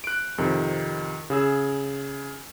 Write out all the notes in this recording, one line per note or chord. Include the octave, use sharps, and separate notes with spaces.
F#6 D7
F2 C3 D#3
C#3 G#4 E6